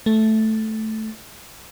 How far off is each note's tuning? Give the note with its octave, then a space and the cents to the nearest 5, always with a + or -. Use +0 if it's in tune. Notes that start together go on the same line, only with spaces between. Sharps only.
A3 -5